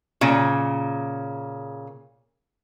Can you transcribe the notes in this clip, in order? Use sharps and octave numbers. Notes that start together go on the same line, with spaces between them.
A#2 C#3